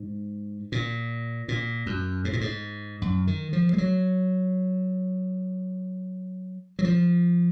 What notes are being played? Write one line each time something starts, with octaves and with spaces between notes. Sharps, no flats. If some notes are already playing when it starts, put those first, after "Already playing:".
Already playing: G#2
A#2
A#2
F#2
G#2
A#2
G#2
F#2
D#3
F3
G#3
F#3
F#3
F3